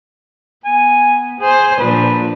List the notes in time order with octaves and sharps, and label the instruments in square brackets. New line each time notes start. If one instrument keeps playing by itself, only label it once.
[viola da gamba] B3 [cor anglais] G#5
[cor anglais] G#4 [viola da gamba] C5
[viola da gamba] A#2 F3 D4 [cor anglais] B4